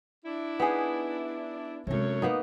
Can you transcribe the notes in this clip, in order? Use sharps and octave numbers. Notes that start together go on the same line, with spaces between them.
D4 E4
B3 D#4 G#4
F#2 C3 G#3 A3 C#5
A#3 B3 D#4